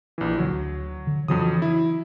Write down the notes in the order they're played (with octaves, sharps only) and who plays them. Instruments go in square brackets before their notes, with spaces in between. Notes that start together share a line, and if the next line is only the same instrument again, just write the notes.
[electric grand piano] A#1 E3
[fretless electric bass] D2 D3 [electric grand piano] F#3
[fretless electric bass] D3
[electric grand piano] F2 F#3 D#6 [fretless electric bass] C#3 E3 D4
[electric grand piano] E4